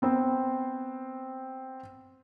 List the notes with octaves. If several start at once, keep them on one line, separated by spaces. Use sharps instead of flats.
B3 C4 C5